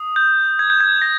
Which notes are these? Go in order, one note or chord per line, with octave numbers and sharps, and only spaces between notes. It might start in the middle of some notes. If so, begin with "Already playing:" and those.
Already playing: D#6
G6
G#6
G6
G#6
A#6